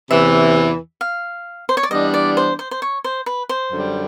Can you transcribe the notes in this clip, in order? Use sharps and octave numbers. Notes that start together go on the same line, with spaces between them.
E2 C3 E3 E5
F5
C5
C#5
D5
E3 G3 B3 D4 D#5
D5
C5
C5
C5
C#5
C5
B4
C5
F#2 D3 G3